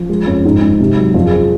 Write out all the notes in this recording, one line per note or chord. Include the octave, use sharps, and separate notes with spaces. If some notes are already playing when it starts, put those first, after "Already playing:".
Already playing: F3
G#3
F2 C#4
G#2 D#4
G#2
C3
F#3
F2 F4
G#4
F3